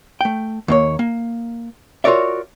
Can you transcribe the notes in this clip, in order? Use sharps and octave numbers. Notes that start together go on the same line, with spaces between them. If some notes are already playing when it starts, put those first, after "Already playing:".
A3 G5
D#2 A#3 C#5
A#3
F4 F#4 A#4 C#5 D5 E5